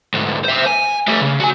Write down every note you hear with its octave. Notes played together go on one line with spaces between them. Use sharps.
D2 G#2
C5 E5
G#5
A3 G4
C#3
F#4 G#5